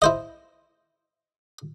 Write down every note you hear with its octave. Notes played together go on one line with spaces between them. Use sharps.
E4 C5 D#5